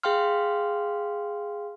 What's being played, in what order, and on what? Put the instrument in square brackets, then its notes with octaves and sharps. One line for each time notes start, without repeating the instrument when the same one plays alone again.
[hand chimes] G#4 F5 G5 C6 F6